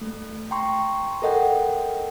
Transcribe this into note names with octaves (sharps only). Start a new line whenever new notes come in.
A3
G5 A#5 C6 C#6
A4 A#4 D#5 F#5 G5